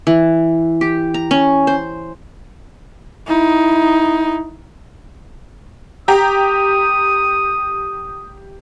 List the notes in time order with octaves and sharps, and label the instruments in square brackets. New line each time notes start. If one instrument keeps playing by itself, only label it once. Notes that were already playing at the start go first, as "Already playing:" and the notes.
[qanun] E3
G4
A#5
C#4
C5
[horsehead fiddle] D#4 E4
[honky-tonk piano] G4 A#5 [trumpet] D#6